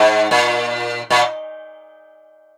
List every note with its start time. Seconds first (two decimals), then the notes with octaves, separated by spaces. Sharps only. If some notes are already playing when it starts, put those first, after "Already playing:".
Already playing: G#2
0.31 A#2
1.10 A#2